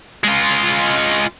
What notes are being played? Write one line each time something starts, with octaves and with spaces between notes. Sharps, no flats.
G#3 F4